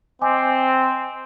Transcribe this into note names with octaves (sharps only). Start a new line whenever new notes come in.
C4 D#5 G#5 D6